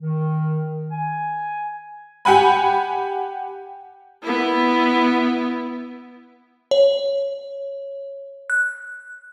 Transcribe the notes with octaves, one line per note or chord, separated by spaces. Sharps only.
D#3
G#5
G4 F#5 G#5 B5
B3 E4
C#5
F#6